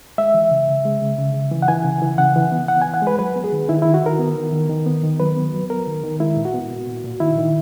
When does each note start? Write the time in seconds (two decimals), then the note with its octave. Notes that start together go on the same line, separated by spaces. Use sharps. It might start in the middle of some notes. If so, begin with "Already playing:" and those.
0.18 G#3 E5
0.34 E3
0.51 C#3
0.68 C#3
0.85 G#3
1.02 C#3
1.18 C#3
1.34 C#3
1.52 E3
1.62 F#5
1.68 E3 G#5
1.85 C#3
2.02 E3
2.18 C#3 F#5
2.36 E3
2.52 B3
2.68 E3 F#5
2.82 E3 G#5
2.94 F#5
3.02 G#3 B4
3.19 F#3 B4
3.36 B3
3.44 G#4
3.53 D#3
3.69 D#3 E4
3.82 D#3 E4
3.94 F#4
4.03 D#3 A#4
4.19 B3
4.36 D#3
4.53 D#3
4.69 D#3
4.86 B3
5.03 D#3
5.19 F#3 B4
5.37 B3
5.53 F#3
5.70 B3 A#4
5.87 D#3
6.04 D#3
6.20 G#3 E4
6.36 A#2
6.45 F#4
6.54 B3
6.70 A#2
6.87 A#2
7.04 A#2
7.20 D#3 E4
7.38 D#3